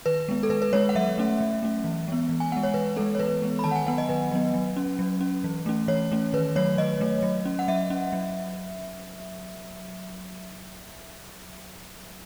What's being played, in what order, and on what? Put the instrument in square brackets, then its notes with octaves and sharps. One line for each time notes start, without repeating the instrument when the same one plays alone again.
[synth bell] D#3 B4
G#3 B3
A4
D#3 B4
B4
G#3 B3 C#5
F#5
F#3 E5
A3 C#4
F#3
A3 C#4
E3
G#3 B3
E3
G#5
G#3 B3 F#5
C#5
E3 B4
G#3 B3 A4
C#5
E3 B4
G#3 B3
B5
D#3 A5
F#5
G#5
F#3 B3 F#5
D#5
D#3 B4
F#3 B3
F#3
C#4
F#3
C#4
E3
A3 C#4
E3 C#5
A3 C#4
D#3 B4
F#3 A3 C#5
D#3 D#5
F#3 A3
F#3
C#4
F#5
F#3 E5
C#4
F#3